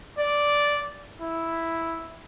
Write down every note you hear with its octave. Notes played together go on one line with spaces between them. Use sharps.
D5
E4